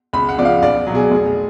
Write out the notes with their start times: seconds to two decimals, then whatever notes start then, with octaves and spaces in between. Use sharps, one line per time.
0.13 C#2 B5
0.29 F#5
0.38 C#3 F3 D5
0.45 F5
0.62 B1 D5
0.87 B2 F#3
0.95 G#4
1.11 F1